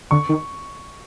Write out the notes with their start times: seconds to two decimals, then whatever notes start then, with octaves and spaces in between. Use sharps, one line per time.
0.11 D3 C#6
0.29 D#3